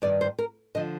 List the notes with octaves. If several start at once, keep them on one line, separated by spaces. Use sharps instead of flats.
G2 D#3 D5
C5
A#4
D3 F3 D#5